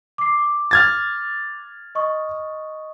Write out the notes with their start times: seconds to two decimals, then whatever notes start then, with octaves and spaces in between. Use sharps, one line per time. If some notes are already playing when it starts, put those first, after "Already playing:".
0.18 D6 C7
0.38 D6
0.71 F6 G#6 A6
1.95 D#5 C#6 D#6